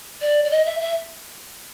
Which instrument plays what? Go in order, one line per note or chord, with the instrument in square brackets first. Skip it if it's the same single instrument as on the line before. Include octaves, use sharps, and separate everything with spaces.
[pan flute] D5
D5
D#5
E5
E5